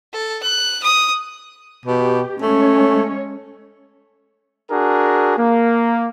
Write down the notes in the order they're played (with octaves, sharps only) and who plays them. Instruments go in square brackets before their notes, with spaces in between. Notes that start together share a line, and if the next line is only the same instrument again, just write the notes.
[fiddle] A4
F#6
D#6
[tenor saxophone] B2 [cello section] G4
[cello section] G#3 C#4 C#5 [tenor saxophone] A3
[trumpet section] D4 F#4 G#4 A#4
A#3